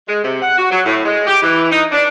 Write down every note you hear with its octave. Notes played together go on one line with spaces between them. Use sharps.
G#3
C3
F#5
F#4
F#3
A2
G#3
G4
E3
D#4
D4